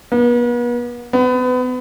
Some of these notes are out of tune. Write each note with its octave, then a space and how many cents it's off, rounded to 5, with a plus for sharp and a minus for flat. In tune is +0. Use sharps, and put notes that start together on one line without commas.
B3 -40
B3 +30